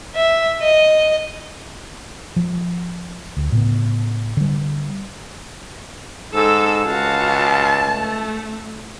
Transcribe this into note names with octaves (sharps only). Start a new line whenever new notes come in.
E5
D#5
F3
D2
A2 C#3 B3
D3 G3
G#2 A4 E6
C#2 F#4 F5 A5
A3